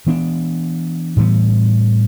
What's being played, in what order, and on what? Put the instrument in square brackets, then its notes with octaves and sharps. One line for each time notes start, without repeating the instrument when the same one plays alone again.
[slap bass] E3 B3 D4
A2 E3 G3 B3